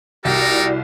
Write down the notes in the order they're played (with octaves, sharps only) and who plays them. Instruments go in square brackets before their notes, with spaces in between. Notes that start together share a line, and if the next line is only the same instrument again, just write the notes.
[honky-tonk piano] C2 [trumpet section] D#4 A4 A#4 [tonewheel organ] E4 F#4 D5 [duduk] G4